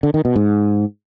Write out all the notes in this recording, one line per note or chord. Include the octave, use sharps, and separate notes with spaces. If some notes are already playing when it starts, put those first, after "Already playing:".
D3
D#3
B2
G#2